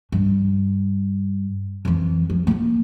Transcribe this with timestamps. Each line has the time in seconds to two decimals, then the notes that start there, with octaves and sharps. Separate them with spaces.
0.12 G2
1.85 F2 E3
2.30 F3
2.47 A#3 F4